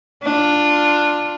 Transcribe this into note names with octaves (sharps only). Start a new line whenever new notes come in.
D4 F4